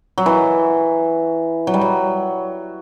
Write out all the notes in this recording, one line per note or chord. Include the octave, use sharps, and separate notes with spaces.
F#3
E3
F#3
G3
F#3